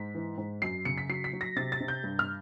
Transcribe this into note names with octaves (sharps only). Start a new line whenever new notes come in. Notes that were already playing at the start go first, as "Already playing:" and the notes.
Already playing: G#2 B6
E3
G#2
F#2 C7
C#3 C#7
B6
F#3 C7
B6
F#3
A#6
C3 A6
A6
C3
G6
G2
F6